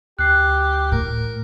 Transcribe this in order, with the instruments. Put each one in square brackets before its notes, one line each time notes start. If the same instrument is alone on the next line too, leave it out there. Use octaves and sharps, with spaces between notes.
[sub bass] D2 [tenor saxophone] G4 [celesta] F#6 C7
[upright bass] A2 [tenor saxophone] A#4